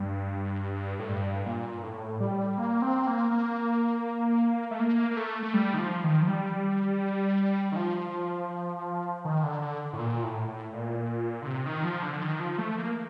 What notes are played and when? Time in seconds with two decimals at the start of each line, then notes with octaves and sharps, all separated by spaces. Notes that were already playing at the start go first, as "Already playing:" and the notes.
Already playing: G2
0.99 A2
1.09 G2
1.46 A#2
1.83 A2
2.20 G3
2.57 A#3
2.82 C4
3.07 A#3
3.31 A#3
4.71 A3
4.80 A#3
5.11 A#3
5.17 A3
5.43 A3
5.54 G3
5.74 D#3
5.78 F3
6.04 D#3
6.22 F3
6.28 G3
7.72 D#3
7.76 F3
9.25 D#3
9.43 D3
9.62 D3
9.93 A2
9.99 A#2
10.23 A2
10.48 A2
10.73 A#2
11.42 D3
11.47 C3
11.66 D#3
11.84 F3
12.03 D3
12.13 D3
12.22 D#3
12.40 F3
12.58 A3
12.77 A#3